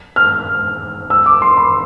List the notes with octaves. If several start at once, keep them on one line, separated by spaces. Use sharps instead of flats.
F6
E6
D6
C6
B5